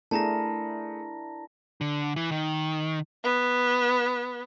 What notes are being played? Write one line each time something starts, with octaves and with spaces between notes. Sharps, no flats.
A3 D4 E4 G#4 A#4 A5 A#5 A#6
D3
E3
D#3
B3